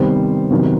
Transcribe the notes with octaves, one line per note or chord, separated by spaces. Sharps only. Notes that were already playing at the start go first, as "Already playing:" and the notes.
Already playing: C3 D#3 G3 B3 C5
C3 D#3 F#3 B3